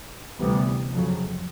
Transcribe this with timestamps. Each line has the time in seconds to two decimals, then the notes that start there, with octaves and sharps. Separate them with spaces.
0.39 D2 C3 E3 G3 B3
0.91 F2 C#3 F#3